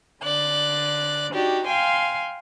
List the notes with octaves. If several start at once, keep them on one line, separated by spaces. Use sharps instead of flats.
D3 D5 F#6
D#4 F#4 G4 D5
F5 G5 G#5 C6